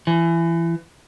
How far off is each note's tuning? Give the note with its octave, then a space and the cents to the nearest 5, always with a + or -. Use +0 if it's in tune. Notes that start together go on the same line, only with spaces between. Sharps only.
E3 +25